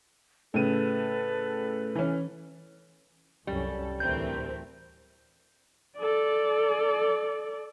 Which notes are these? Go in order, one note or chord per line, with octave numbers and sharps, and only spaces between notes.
A2 C#3 A4 B4 D#7
E3 C#4
C2 F#2 G3 C#4 A4
D2 A2 E3 A3 C4 A#4 G6
A4 D5